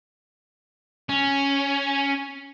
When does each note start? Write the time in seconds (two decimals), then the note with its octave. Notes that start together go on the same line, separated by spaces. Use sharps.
1.09 C#4